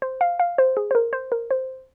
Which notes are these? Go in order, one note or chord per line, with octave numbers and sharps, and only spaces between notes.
C5
F5
F5
C5
G#4
C5
A#4
C5
A#4
C5